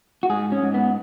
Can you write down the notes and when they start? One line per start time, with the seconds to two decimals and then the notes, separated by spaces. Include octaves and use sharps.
0.23 F#4
0.30 G#2 G#4
0.52 C#4
0.63 G#2
0.74 B3